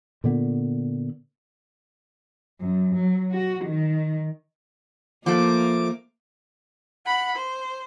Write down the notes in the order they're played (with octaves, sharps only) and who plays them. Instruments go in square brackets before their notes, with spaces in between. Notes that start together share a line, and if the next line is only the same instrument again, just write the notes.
[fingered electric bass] A#2 D3 B3
[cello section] F#2
F#3
F#4
D#3
[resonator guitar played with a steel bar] F3 A3 [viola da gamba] A#3 [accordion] D6
[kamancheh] F#5 B5
C5